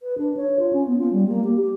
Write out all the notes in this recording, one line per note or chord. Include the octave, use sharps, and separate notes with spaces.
B4
D4
C#5
F4
C#4
B3
F4
G3
A#3
G4
G4